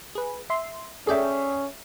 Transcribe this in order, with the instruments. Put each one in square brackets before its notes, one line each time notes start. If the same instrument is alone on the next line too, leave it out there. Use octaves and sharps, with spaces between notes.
[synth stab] G#4 B4
E5 C6
[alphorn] C#4 [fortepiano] G#4 E5 [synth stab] A4 D5 G5